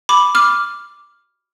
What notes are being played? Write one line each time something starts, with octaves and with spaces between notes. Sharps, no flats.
B5 D6
D6 F6